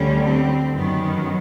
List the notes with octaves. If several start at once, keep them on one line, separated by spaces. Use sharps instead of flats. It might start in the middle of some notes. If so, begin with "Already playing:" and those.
Already playing: D2 D3 G3 C#4
C4
F#2 D#3 F#3 B3